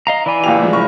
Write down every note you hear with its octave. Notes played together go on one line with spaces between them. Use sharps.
D#5 F5 A#5
E3 D5 G#5 B5
C#2 A#2 G4 F7
A2 F3 G#3
F#1 C#6